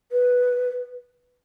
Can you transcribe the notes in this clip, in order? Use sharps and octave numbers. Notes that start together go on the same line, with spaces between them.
B4